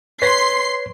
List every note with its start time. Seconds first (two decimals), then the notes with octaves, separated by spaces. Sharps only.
0.22 B4 C#5 C6 B6 C7